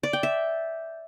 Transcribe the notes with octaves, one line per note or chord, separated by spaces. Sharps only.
D5
G5
E5